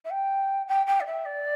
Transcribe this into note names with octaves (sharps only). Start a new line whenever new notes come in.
E5
G5
G5
G5
D5
E5
D5